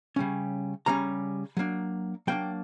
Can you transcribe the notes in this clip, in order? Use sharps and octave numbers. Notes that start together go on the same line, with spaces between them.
C#3 G3 C#4
C#3 G3 C#4 A#5
F#3 A#3 D4
F#3 A#3 D4 G5